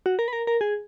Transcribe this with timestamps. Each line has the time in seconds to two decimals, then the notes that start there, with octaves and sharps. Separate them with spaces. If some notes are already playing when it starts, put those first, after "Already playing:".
0.06 F#4
0.19 A#4
0.28 B4
0.33 A#4
0.47 A#4
0.61 G#4